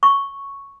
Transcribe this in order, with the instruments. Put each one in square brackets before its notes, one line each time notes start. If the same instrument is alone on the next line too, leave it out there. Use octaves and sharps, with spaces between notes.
[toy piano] C#6